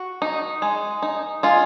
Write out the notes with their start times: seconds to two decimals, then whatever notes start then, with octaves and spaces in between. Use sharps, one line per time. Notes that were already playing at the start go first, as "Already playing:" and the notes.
Already playing: F#4
0.22 D#4
0.62 G#3
1.02 D#4
1.43 G#3 F4